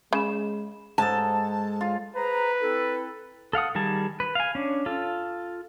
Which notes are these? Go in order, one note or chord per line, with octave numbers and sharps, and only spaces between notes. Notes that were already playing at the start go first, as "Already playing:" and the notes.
C#3 G#3 B5 E7
G#2 A4 A5
F4
G#4 B4 C5 A#5
C4 E4 A4
A4 F5 F#5 D#6
D#3 G3 G#4 A5
B4
F5 G#5
C#4 D4
F4 A4